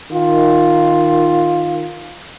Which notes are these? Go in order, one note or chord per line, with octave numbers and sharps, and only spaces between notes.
D#3 F4